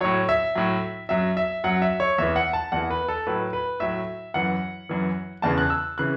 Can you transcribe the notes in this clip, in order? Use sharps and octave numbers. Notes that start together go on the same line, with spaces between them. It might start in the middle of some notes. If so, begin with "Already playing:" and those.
A2 F#3 C#5
E5
A2 F#3
F#2 F#3 E5
E5
F#2 F#3 F#5
E5
C#5
E2 E3 E5
F#5
A5
E2 E3 F#5
B4
A4
A2 F#3 B4
B4
A2 F#3 E5
F#2 E3 F#5
F#2 E3
E2 C#3 E3 A5
F#6
E6
C#3 E3 F#6